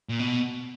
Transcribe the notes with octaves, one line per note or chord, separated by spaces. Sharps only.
A#2
B2